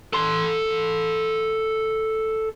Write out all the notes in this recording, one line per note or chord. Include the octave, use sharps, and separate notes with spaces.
A4 C6